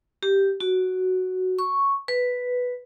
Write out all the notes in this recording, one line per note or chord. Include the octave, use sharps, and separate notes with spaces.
G4
F#4
C#6
B4